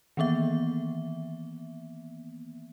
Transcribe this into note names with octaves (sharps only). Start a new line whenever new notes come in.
D#3 E3 A#3 B3 E5